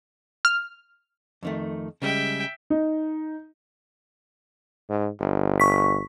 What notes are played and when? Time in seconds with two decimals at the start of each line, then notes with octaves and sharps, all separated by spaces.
0.45 F6
1.43 F2 D#3 A3
2.02 C#3 G3 G#3 E5 G5
2.70 D#4
4.89 G#2
5.20 G1
5.60 C#6 B6